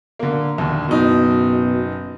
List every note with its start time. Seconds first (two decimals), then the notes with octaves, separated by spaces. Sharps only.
0.19 D3 A#3
0.58 D#2 D3
0.88 F#1 B2 D#4